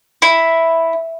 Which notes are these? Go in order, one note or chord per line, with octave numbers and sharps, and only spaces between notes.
E4